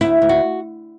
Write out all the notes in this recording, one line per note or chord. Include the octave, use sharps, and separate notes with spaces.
D2 E4
D2
F#4